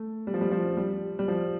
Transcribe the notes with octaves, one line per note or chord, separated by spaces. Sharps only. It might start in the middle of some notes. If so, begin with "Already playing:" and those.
Already playing: A3
G3
F3
G3
F3
G3
G3
F3